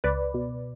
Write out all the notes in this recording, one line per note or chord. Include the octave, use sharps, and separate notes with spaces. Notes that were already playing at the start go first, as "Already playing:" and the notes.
C#2 B4 D5
B2